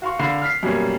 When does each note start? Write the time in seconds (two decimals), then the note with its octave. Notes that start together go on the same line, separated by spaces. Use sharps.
0.02 F#4 F5 C6 C#6
0.19 D3 F5 B5 C7
0.42 F6 B6 C7
0.63 F#2 B2 G3 A#3 C#4